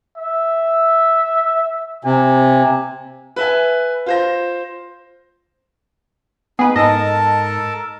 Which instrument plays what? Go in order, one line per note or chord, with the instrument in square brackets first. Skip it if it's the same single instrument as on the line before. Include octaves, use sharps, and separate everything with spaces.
[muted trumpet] E5
[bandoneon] C3 [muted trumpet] G#5
[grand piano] B4 E5 G#5
F4 C5 A#6
[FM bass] B3 [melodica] D#4 [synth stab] G#4 B4
[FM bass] G#2 [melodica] A4 A#4 A5 [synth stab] D#5